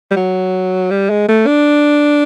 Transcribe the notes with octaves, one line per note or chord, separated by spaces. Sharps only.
G3
F#3
G3
G#3
A3
D4